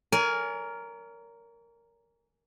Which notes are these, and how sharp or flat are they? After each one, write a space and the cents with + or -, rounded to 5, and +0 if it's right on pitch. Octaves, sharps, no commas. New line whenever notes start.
A#4 +0 C#5 +45 G#5 +0